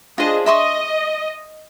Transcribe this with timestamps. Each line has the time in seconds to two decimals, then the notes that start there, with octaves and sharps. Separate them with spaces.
0.18 D4 F4 G#4 C5 D#5
0.46 D#5 E5 C6 C#6